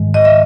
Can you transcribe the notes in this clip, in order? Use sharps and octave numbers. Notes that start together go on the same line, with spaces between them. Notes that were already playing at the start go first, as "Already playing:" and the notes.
Already playing: G#2 D#3 G#3
D#5
E5